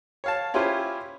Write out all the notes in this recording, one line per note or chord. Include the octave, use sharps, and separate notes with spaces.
C#5 F5 A5
C#4 E4 F4 G4 B4 C5